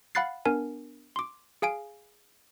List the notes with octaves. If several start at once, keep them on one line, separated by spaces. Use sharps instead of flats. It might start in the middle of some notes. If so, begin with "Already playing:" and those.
F5 F#5 B5 F#6 A6 C7
B3 D4 A#4 G#5
C6 D6
G#4 F5 G#5 D7